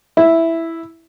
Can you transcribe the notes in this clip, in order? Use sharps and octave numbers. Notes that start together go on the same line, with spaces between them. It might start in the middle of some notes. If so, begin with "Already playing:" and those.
E4